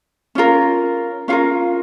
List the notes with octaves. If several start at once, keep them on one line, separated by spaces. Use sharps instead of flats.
C#4 F4 A#4
C#4 F4 A#4 F5